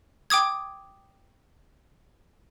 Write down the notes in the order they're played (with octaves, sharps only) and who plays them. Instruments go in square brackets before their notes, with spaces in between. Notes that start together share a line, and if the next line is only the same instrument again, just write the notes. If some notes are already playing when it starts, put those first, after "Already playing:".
[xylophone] G5 D6 D#6 G#6